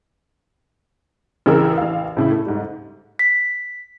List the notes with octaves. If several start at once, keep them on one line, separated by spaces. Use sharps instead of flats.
A1 C#3 E3 G#4 A#4 E6
A1 F5
A2 C#3 E4
A3
G#2 G3
B6